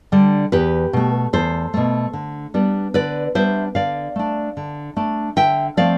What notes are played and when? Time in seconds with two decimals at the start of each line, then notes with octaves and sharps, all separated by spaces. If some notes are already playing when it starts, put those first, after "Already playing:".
0.12 D3 G3 D4
0.52 E2 G4 B4
0.93 B2 A3
1.33 E2 A4 C5
1.74 B2 A3
2.13 D3
2.54 G3 B3 D4
2.94 D3 B4 D5
3.35 G3 B3 D4 C5 E5
3.75 D3 D5 F5
4.16 A3 D4
4.57 D3
4.96 A3 D4
5.36 D3 E5 G5
5.77 F3 A3 C4 D5 F5